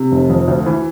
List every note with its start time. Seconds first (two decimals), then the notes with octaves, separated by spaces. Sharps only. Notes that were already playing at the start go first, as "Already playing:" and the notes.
Already playing: C3
0.12 F1
0.30 F2
0.48 D2
0.66 E3